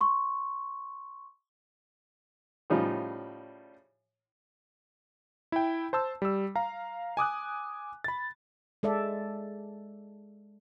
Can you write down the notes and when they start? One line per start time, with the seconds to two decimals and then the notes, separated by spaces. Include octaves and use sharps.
0.01 C6 C#6
2.70 A2 C#3 F3 G3 D#4 F4
5.52 E4 G5
5.93 C5 A5 E6
6.22 G3 E6
6.56 F5 A#5
7.17 G#5 D6 D#6 F#6
8.04 B5 A6
8.83 G#3 A4 D5 E5